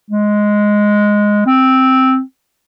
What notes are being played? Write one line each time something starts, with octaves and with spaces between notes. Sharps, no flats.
G#3
C4